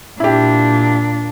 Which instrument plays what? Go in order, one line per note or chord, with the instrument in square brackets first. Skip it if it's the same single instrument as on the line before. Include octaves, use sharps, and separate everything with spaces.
[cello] A#2 D4 [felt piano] E4 G4